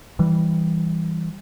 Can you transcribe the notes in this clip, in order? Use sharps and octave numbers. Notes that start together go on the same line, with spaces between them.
E3 G3